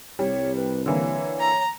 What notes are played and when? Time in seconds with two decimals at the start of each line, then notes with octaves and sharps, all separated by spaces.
0.19 C2 G3 C#5
0.56 B4
0.86 D3 E3 A#3 C#5
1.40 A#5